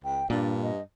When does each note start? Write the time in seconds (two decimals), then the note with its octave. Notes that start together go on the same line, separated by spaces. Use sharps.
0.04 C#2 G5
0.30 G2 A#2 D4
0.63 D#5